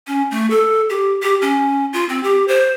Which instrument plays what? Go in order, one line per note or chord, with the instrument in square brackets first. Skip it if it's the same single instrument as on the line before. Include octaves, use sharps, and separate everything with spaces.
[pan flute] C#4
A3
A4
G4
G4
C#4
F4
C4
G4
C5